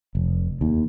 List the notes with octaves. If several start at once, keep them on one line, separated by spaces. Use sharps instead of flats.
F1
D#2